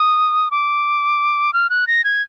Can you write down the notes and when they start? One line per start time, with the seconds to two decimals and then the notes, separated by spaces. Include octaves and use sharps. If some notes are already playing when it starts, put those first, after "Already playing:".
Already playing: D#6
0.51 D6
1.53 F6
1.70 F#6
1.87 A#6
2.04 G#6